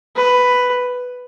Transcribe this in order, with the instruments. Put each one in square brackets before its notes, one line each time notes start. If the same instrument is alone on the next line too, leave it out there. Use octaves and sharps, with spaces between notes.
[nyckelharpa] B4